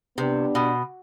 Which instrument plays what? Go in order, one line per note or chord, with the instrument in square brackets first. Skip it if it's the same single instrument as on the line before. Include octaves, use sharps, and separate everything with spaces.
[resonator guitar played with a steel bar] C3 [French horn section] B3 D4 G4
[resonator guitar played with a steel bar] B2